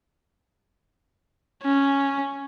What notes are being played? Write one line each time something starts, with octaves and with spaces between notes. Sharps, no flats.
C#4